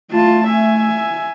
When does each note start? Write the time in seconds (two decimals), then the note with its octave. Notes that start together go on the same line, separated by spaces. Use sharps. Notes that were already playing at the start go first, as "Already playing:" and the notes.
0.11 A3 F4 A5
0.47 E5 G#5